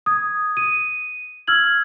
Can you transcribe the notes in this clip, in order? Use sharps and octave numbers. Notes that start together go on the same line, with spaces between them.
D#6 G#6
D#7
E6 F6 G#6 F#7